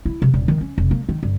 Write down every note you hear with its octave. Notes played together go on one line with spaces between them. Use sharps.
E4
C3
D#1
D#3
C#4
F1
A#3
D#3
G1